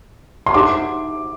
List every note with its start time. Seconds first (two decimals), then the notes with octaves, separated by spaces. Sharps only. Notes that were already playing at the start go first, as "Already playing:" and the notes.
0.46 C6
0.54 D#4 G4 C5 F#5 D6